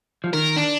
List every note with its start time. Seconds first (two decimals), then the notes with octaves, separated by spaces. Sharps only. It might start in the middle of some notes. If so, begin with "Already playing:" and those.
0.24 F3
0.33 D#3 A#4
0.57 D4